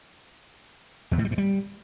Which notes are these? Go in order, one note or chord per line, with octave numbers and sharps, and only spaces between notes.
E2
A2
G3
G2
G3